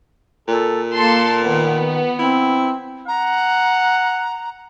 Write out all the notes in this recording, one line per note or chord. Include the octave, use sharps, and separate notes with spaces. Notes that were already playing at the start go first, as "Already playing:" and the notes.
A#2 A4
A#3 A4 A5 C6
D#3 B3
C4 E4
F#5 A#5